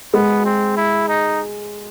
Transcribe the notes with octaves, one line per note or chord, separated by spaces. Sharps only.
G#3 B3
C4
E4
D#4